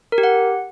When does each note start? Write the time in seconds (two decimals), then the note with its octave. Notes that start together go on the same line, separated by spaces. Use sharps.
0.12 A#4
0.18 G4
0.23 F#5